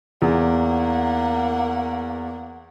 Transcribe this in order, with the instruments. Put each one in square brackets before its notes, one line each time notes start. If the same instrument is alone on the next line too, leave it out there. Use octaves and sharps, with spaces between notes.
[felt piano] E2 [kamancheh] A#3 F#5